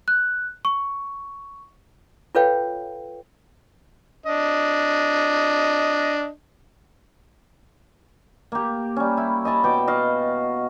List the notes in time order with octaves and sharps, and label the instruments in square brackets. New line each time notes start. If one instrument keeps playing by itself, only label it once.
[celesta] F#6
C#6
[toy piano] F4 A4 B4 C#5 F5 G5
[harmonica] D4 D#5
[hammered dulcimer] A#3 G4
G3 C#4
E4
D#5 G#5 A5 B5
B2 G5 D6
F#4 D#5 F5